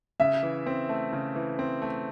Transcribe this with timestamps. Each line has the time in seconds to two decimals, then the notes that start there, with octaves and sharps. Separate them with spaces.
0.20 C#3 E5
0.43 E3
0.66 C4
0.89 A3
1.13 C#3
1.35 E3
1.59 C4
1.82 A3